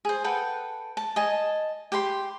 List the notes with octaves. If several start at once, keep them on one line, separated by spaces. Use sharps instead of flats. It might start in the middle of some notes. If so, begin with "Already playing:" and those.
G#4 C5
A4 B4 F#5 G5
A5
D#5 G#5 A5
G4 G5 B5 C6